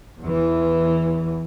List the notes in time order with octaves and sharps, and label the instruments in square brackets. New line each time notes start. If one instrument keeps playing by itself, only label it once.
[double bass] E2 E3